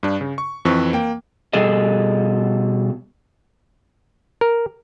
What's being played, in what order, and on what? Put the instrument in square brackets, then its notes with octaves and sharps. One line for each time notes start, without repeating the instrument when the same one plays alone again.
[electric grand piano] G2 D4
C#3
C#6
F2 E3 C4 B4 C#6
A#3 G5
[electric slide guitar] B2 G3 G#4 A4 D#5
[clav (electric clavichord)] A#4